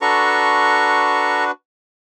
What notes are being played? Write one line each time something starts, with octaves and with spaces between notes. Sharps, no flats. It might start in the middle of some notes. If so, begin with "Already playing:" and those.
D4 F#4 A4 B4 A#5 C#6